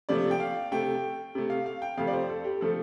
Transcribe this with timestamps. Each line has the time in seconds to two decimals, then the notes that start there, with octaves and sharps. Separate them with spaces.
0.09 C3 F3 A3 D5
0.31 G5
0.40 F5
0.72 C3 A3 G5
1.35 C3 A3
1.50 F5
1.66 F5
1.82 G5
1.98 F2 C3 F3 A3 F5
2.07 D5
2.13 C5
2.30 A4
2.44 G4
2.61 C3 F3 A3 A4